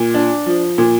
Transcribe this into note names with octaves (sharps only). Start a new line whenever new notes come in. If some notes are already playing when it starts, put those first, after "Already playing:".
Already playing: A#2
D4
F3
A#2